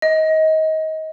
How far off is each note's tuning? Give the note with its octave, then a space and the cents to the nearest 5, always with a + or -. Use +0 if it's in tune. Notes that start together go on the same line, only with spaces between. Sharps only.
D#5 +25